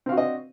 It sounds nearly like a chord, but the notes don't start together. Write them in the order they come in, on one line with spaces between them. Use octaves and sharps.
C4 F5 F#4 D4 D#5